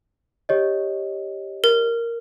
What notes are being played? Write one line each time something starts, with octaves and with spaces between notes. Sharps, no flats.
G4 C#5 D#5
A#4